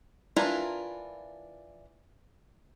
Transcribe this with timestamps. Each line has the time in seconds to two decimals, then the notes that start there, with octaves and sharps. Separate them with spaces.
0.36 E3 D4 E4 F4 A#4